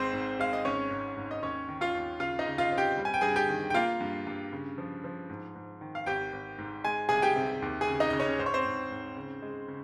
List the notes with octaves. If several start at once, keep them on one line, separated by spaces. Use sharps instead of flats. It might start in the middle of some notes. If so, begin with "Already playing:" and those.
Already playing: G#1 G#3 C4 C5
G#2
G#3 F5
D#5
G#1 C#4 C#5
G#2
G#2
D#5
D#2 C#4 C#5
D#3
F4 F5
D#2
C#3 F4 F5
D#4 D#5
C#3
F4 F5
C4
G4 G5
G3
G#5
G5
G2 G#4 G#5
G4 G5
D#3
G5
A#3 F4 F5
G2
G2
C#3
F3
F3
G#2
G#2
D#3
F5
G#1 G4 G5
G#1
G#2
G#3 G#5
C2 G#4 G#5
G4 G5
C3
D#2
G#4 G#5
C#3
D#4 D#5
C#3 D#5
C#4 C#5
G#2 C5
C#5
C4 C5
G#2
G#2
C#3
G#3
C#3